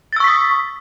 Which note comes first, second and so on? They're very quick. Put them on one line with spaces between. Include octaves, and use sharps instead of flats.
A6 E6 C#6 B6 D#6